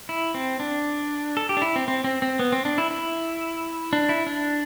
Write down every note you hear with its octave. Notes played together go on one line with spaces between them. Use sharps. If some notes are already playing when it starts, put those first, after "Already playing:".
E4
C4
D4
A4
G4
D4
E4
C4
C4
C4
C4
B3
C4
D4
E4
E4
D4
E4
D4